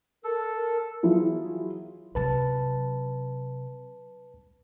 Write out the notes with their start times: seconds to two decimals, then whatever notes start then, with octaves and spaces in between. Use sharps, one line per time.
0.24 A4 A#4
1.03 E3 F#3 E4 F4 G#4
2.15 C3 F#3 B4 A5